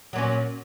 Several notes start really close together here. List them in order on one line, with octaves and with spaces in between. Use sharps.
F#3 A#2 C#4